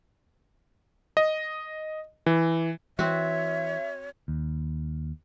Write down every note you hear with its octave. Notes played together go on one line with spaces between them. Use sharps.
D#5
E3
E3 C4 F#4 C#5 E5
D#2